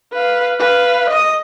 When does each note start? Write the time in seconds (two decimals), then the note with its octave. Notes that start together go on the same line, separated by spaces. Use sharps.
0.13 B4 F5
0.60 B4 F5
1.10 D#5 D#6